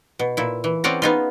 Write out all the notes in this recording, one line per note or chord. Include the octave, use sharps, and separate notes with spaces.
B2
A#2 E4
E3
C4 C#4 G#4 D5 F#5 A#5
B3 D#4 F4